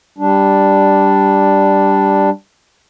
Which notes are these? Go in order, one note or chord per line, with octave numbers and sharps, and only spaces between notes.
G3 D4